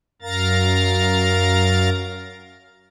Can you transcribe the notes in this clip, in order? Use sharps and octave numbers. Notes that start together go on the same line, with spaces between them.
F#2 A#4 F5 A#5 A6